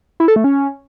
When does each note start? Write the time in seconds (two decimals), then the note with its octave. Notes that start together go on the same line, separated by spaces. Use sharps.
0.20 E4
0.28 A4
0.36 A3
0.44 C#4